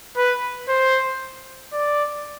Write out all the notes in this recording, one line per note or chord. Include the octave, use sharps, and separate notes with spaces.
B4
C5
D5